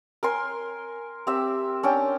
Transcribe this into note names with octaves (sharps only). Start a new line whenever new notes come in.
A#4 G#5 C6
C4 G4 E5
C#4 D4 G5